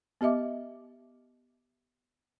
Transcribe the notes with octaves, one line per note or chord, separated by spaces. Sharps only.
B3 G4 D#5 E5 D6